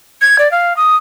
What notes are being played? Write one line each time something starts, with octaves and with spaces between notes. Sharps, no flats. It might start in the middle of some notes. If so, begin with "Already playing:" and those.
G#6
D5
F5
D#6